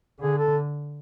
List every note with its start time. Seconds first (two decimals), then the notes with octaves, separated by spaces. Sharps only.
0.20 D3 G#4
0.38 A4